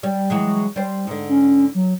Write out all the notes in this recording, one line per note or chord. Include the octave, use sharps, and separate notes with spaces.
G3
E3 F#3 G#3
G3 C5
G#2 D3
C#4
F#3